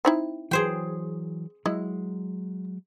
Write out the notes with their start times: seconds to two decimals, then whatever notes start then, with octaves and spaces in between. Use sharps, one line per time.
0.05 C4 D#4 E4
0.51 E3 F#3 G#4 C5 G5
1.66 F#3 G#3 E4 D#5